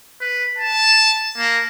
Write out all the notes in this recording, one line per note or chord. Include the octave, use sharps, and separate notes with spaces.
B4
A5
A#3